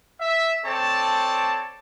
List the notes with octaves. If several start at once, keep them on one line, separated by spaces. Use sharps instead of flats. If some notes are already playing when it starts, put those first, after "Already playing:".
E5
C4 A4 C#5 D5 A5